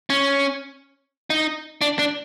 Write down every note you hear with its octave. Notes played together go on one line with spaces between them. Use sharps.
C#4
D#4
D4
D4